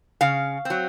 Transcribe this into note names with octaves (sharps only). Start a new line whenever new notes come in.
C#3 F5
F#3 C4